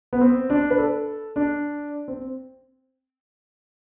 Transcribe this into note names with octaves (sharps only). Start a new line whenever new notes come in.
B3
C4
D4
B4
A4
D4
C4